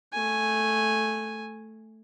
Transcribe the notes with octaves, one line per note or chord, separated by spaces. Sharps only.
A3 G#5